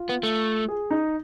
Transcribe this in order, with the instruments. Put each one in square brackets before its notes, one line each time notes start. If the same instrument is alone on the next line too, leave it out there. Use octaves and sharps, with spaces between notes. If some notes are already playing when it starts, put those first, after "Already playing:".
Already playing: [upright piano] F4
[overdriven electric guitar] B3
A3
[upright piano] G#4
D#4